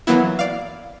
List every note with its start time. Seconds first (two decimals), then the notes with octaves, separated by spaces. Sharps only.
0.07 E3 F#3 A#3 B3 E4
0.39 D5 F5